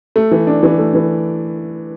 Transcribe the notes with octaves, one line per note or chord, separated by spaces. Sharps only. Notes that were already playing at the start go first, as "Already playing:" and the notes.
A3
E3
D4
E3
A3
E3